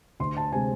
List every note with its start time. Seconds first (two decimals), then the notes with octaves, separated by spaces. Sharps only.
0.20 D2 C6
0.37 A5
0.52 C3 G#3 C4 G#5